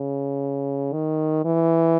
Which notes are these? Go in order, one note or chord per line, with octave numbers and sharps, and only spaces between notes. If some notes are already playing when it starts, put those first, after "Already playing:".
Already playing: C#3
D#3
E3